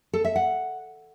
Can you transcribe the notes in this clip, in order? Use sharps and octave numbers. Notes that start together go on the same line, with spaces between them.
A4
E5
F#5